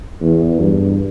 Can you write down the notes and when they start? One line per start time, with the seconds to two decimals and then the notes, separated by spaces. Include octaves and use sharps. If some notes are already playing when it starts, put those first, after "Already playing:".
0.21 E2
0.60 G2